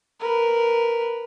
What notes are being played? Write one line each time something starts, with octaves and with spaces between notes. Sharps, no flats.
A#4 B4